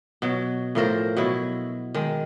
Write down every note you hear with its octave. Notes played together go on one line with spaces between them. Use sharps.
B2 F#3
A2 F3 A#4 C5
B2 F#3 E4
D#3 G#3